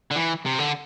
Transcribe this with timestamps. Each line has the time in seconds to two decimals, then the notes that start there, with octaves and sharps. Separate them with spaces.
0.11 D3
0.16 E3
0.46 C3
0.59 D3